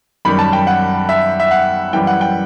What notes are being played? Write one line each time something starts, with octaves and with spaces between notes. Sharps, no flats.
F#2 D#3 G3 B5
A5
G5
F#5
E5
E5
F#5
F#2 E3 G3 G5
F#5
G5